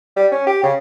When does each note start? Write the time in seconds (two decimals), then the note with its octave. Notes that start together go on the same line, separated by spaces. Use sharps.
0.16 G3
0.32 C#4
0.47 G4
0.63 C#3